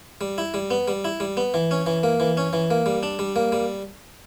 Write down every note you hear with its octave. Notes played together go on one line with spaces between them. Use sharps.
G3
E4
G3
B3
G3
E4
G3
B3
E3
C#4
E3
A#3
E3
C#4
E3
A#3
G3
D4
G3
A#3
G3